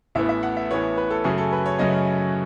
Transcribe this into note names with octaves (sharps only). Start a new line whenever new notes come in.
A1 A2 E3 B3 E5
E5
F#5
E5
A1 A2 E3 B3 C#5
B4
A4
F#2 C#3 F#3 A3 C#4 G#4
A4
B4
C#5
F#2 C#3 F#3 A3 C#4 D#5